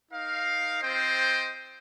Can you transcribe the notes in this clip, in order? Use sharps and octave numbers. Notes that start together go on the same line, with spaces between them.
D#4 A#4 F5
C4 F4 C5 D#5 G5